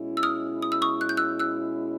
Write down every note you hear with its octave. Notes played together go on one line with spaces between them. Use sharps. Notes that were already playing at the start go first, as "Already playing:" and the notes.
Already playing: B2 G#3 C#4 E4
E6
D#6 F6
D#6
E6
C#6 D#6
F#6
G6
E6 F#6
E6 F#6